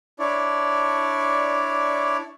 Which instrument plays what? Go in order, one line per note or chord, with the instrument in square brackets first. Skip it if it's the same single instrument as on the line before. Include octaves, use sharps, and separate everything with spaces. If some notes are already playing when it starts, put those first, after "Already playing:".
[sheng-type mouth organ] D4 E4 C#5 D5